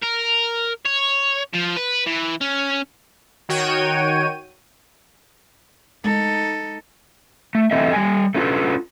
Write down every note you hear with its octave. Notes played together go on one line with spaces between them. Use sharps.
A#4
C#5
F3
B4
E3
C#4
D#3 F#4 C#5 G5 D#7
G#3 D#4 A4
A3
E3 C4 A4 D#5 E5
G3 G#5
A3 C#4 F4 A4 B4